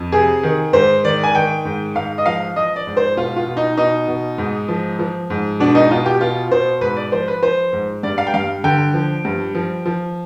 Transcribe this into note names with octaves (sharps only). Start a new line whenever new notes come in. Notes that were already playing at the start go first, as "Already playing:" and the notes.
Already playing: F2
C3 G#4
D#3
G#2 C5
D#3 D5
G#5
D#3 G5
G#2
G#2 F5
D#5
F3 F5
F3 D#5
D5
G#2
C5
B2 F4
F4
B2
D#4
B2 D#4
B2
G#2
F3
F3
G#2
B2 D4
D#4
B2 F4
G4
B2 F4
B2 C5
G#2 B4
D5
F3 C5
B4
F3 C5
G#2
G2 D5
F5
G5
G2 F5
D3 G5
F3
G2
F3
F3